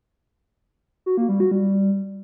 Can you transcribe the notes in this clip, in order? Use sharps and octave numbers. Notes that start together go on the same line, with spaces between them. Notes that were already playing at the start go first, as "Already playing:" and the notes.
F#4
A#3
G3
F#4
G3